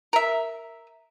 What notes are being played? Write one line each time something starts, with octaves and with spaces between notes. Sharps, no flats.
A#4 E5